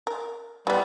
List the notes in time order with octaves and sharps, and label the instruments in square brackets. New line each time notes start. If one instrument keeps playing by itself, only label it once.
[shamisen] A#4
[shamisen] E3 B3 [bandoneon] G3